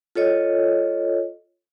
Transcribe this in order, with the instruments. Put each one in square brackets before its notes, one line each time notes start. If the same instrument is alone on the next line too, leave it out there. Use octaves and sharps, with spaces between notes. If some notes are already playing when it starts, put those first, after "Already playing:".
[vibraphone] F4 A4 C#5 D#5